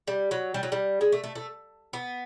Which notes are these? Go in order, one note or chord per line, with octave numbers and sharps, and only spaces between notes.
G3
F#3
G3
F#3
G3
G#3
A3
A3
A3
B3